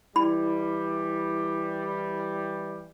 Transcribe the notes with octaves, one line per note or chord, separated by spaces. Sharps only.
E3 G3 E4 B5